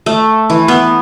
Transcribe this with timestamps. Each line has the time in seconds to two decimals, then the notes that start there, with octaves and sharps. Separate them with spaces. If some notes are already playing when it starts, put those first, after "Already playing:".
0.06 A3
0.50 E3
0.68 B3